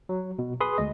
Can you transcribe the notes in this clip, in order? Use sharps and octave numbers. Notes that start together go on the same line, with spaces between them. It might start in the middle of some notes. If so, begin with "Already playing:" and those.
F#3
B2
G#4 B4 B5 C6 D#6
D2 G#3 D#5